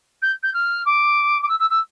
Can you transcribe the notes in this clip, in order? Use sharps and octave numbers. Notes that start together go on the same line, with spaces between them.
G6
G6
F6
D6
D6
E6
E6
E6